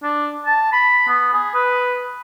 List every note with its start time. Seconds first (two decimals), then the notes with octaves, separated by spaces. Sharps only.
0.03 D4
0.46 A5
0.73 B5
1.08 B3
1.33 G#4
1.55 B4